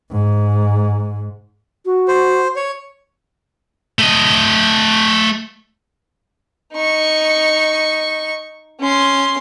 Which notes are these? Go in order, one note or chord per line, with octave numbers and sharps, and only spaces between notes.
G#2
F#4
C5
C#5
A3 D#5
D#4 C#6
C#4 C6